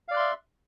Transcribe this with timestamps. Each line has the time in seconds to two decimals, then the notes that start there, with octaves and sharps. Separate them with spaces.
0.08 F5
0.11 D5
0.14 F#6
0.17 C6
0.19 E5